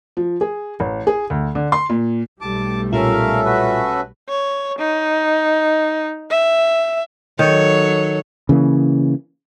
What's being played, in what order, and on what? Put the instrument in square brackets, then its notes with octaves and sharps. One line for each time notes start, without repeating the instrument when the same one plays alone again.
[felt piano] F3
G#4
A1
G#4
D2
D3
C6
A#2
[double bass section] B1 G3 A3 [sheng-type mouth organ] A5 D6
[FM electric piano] A#2 F4 [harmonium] C#4 A4 E5 [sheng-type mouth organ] A#4 F5
[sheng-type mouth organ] F#4 B4
[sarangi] C#5
D#4
E5
[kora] D#3 [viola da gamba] F#3 A4 C#5
[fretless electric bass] C#3 E3 A#3